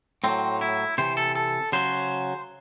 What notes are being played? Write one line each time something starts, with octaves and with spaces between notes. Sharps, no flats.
A2 F#3 C4
E4
C3 E3 C5
A4
A4
C#3 F#3 C5